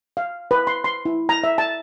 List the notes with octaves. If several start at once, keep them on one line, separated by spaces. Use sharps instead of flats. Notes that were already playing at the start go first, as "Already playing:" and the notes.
F5
B4
C6
C6
E4
A#5
E5
A5